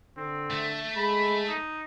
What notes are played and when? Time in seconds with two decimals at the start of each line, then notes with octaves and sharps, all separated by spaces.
0.17 D3 C4
0.50 A3
0.96 G#3 B5
1.48 D#4